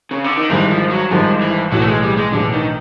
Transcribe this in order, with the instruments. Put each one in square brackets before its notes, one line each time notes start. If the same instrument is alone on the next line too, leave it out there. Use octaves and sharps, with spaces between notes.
[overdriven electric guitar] C#3
D3
D#3
[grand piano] G#1 G2 D#3 G#3 [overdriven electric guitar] E3
[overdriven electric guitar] F3
F#3
[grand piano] G#1 G2 D#3 G#3 [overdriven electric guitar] F3
[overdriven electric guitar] E3
[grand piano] B1 A2 E3 [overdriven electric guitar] F#3
[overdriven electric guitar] A3
G#3
G3
G#3
[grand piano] B1 A2 E3 [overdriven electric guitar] D3
[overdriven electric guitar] D#3